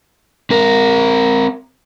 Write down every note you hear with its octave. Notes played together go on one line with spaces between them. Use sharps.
C4 A#4